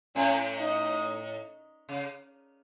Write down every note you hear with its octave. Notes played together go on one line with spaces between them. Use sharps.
A2 C#4
D#4
C#3